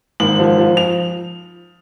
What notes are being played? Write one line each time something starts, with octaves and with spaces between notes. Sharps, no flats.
G#1 F#7
F3
F3
F7